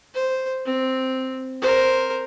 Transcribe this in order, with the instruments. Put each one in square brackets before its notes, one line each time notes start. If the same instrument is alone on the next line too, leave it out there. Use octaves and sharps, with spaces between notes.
[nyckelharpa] C5
C4
A#4 C5